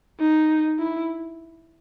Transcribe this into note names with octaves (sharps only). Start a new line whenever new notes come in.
D#4
E4